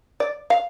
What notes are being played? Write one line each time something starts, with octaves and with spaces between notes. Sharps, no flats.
D5
F5